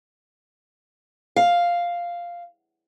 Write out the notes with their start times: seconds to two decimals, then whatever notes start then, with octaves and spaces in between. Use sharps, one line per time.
1.36 F5